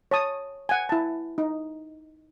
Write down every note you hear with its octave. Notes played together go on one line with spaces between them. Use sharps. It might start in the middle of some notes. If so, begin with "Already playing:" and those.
C#5 A5 D#6
F#5 G#5
E4 A5
D#4